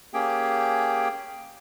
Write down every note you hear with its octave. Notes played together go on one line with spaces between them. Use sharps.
A#3 C#4 G4 G#4 G5